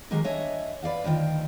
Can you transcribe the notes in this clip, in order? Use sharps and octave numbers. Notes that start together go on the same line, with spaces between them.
D#3 F#3 G#3 G4 A#4 D#5
D4 C#5 D#5 E5 G#5
B4 D5 F5 F#5
D2 D#3 F4 G5